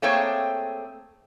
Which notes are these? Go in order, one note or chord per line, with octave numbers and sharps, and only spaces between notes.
A3 A#3 C4 G#4 C#5 G5